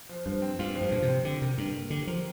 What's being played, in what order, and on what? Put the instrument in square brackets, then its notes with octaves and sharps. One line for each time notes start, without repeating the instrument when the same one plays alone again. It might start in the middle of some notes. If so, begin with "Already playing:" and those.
[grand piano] F3
[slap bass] G2 [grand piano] F3
[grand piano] C4
[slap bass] G2 [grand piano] F4
[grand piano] F3
[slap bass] G2
[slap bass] A#2 [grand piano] F3
[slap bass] C3
[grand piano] C4
[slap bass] D3 [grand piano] G4
[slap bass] C3 [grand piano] A#4
[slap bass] G2 [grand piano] D3
[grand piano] A#3
[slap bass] D3 [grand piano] G4
[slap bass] F3 [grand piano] A#4